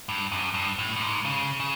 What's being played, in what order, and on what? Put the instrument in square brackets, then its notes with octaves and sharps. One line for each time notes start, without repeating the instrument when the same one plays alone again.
[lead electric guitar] G2
F#2
G2
A2
A2
G#2
C#3
C#3